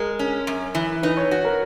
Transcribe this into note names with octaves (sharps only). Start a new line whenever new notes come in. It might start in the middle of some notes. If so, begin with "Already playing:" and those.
Already playing: G#3 A#4
C#4
F#2
E3
D#4 B4
C#5
F#4
A#4